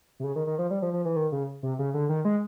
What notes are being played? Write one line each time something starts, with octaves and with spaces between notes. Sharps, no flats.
C3
C#3
D#3
D#3
F3
G3
F3
F3
E3
D#3
C#3
C3
C#3
D3
D#3
G#3